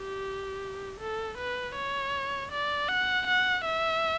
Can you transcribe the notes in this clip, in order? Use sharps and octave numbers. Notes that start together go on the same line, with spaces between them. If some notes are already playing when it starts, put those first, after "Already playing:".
Already playing: G4
A4
B4
C#5
D5
F#5
F#5
E5